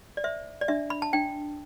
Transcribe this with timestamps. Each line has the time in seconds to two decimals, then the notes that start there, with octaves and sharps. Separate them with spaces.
0.17 D5
0.24 C5 E5
0.61 D5
0.68 D4 E5
0.90 B5
1.02 A5
1.13 D4 G5